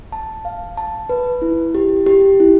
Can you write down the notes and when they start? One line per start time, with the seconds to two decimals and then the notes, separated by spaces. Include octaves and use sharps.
0.12 A5
0.45 F5
0.77 A5
1.09 B4
1.42 E4
1.75 G4
2.07 G4
2.40 E4